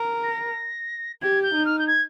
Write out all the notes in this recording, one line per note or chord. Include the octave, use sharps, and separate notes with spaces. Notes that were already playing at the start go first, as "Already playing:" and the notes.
Already playing: A#4
A#6
G4 G#6
G6
D#4
F6
G6
G#6